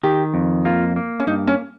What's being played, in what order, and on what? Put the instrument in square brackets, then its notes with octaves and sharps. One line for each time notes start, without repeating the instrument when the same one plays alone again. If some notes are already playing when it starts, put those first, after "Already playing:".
[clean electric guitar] D#3 [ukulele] G4
[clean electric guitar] F2
[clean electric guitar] A#3 [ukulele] F4
[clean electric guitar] A#3
[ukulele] C#4
[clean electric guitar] G2 [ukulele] D#4
[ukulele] C#4